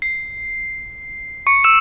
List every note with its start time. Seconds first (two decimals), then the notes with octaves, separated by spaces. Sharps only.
0.02 C7
1.47 C#6 C#7
1.64 E6 E7